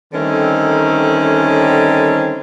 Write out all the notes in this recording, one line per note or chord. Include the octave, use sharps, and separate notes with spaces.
D3 D#3 G3 A3 C4 C#4